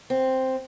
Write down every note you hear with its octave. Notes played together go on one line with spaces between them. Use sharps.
C4